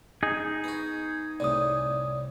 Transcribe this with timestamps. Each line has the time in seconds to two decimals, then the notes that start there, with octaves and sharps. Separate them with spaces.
0.23 D#4 G#4
0.64 B3 F#4
1.40 C2 A2 C3 D5 D#6